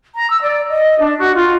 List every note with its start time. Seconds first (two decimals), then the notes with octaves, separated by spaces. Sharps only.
0.17 A#5
0.30 E6
0.43 D5
0.68 D#5
0.99 D4
1.19 F#4
1.35 F4